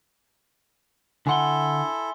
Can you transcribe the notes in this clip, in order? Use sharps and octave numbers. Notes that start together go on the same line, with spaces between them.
D3 E4 A4 F#5 G#5 C6 G7